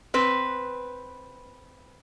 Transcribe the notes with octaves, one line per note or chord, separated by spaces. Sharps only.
C4 B4